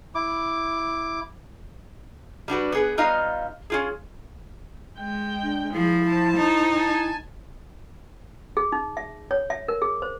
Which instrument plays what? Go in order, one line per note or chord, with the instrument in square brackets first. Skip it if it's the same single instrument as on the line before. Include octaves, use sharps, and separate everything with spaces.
[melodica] E4 D6
[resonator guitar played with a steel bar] G3 D4 F#4 B4
B3 G#4 B4
G3 B3 D#4 F4 D#5 F5
C#4 F4 G#4
[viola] G#3 G5
[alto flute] D4
[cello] F3 [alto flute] E4 [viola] G#4
[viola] C5 A5
[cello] D#4
[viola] G#5 A5
[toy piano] G#4
D#4
E5
C#5
E5
A#4
G#4
C5